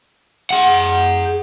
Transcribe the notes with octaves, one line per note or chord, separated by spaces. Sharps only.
G#4 F#5